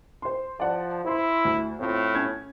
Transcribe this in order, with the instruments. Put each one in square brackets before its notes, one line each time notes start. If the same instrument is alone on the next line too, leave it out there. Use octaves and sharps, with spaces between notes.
[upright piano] C5 C6
[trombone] F3 [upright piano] D5 F#5 A5
[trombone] E4 [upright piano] C5 C6
[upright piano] D2
[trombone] A2 [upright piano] C4 F4
[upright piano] C#4 G#6